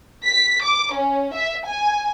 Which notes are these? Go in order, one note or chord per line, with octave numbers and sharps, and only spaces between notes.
B6
D6
C#4
E5
G#5